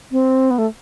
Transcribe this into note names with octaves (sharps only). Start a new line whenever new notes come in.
C4
B3
A3